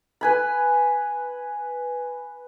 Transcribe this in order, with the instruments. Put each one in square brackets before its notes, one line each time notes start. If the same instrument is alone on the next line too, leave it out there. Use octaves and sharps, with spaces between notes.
[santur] B4 G#5 B5